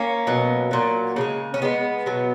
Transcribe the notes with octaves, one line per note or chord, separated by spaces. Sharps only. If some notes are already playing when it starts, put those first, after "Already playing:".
Already playing: A#3 C#4
B2 F#3
A#2 F#3
C#3 F3 G#3
C#4
C#3 G#3 B3
B2 F#3